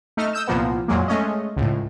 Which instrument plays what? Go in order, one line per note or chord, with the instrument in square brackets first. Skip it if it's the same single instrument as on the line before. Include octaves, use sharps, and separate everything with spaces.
[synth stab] A3 D#4 F6
D#6 E6 G6 E7
C2 A#2 F3 A#3 B3
F2 A#2 F#3 G#3 A#3
G#3 A3 C#4 D#5
C#2 A2